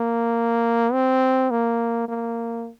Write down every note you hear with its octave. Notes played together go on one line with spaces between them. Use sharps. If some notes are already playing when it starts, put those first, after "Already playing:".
Already playing: A#3
C4
A#3
A#3